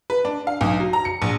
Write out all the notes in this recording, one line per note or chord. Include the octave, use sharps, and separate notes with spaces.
B4
D4
F5
B1
F#3
A#5
C#7
A#1